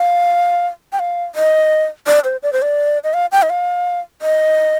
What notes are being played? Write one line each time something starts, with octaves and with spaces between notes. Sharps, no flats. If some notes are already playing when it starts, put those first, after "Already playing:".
Already playing: F5
G5
F5
D#5
D5
C5
D5
C5
D5
D#5
F5
G5
D#5
F5
D#5